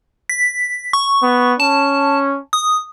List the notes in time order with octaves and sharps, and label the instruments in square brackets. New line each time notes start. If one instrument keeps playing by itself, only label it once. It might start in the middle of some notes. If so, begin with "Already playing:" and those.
[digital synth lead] B6
C#6
[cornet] B3
[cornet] C#4 [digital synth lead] A5
[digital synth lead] D#6